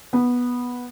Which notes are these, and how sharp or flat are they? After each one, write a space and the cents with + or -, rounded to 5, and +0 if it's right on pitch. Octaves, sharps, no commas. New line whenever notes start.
B3 -10